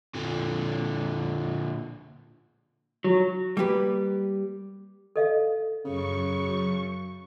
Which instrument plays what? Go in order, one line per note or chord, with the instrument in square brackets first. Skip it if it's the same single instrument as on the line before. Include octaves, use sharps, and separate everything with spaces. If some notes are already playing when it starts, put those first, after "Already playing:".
[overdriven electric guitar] A#2 D3
[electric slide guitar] F#3
[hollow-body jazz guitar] G3 A#3 G4 B4
[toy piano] A4 D#5 F5
[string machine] F#2 C#6 [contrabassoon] C#3